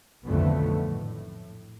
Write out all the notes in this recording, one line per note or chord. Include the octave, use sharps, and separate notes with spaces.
B1 F2 D3 D#3 A3 B3
A2